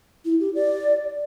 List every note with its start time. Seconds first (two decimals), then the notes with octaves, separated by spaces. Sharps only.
0.25 E4
0.40 G4
0.55 D5